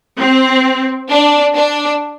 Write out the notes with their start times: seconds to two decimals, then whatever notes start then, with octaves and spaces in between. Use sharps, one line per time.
0.18 C4
1.10 D4
1.56 D4